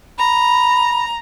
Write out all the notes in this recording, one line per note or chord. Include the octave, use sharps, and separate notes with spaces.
A#5 B5